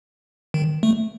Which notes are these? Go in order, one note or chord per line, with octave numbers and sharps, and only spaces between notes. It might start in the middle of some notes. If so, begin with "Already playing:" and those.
D#3
A3